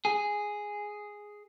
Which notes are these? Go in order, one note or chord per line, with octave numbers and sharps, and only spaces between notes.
G#4